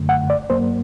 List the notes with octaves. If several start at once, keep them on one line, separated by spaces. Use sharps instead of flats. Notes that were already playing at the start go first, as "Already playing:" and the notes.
Already playing: F#2 D3 A3
F#5
D5
G2 F#3 A#3 C5